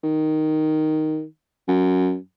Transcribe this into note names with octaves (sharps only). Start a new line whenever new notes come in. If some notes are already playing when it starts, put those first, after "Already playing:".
D#3
F#2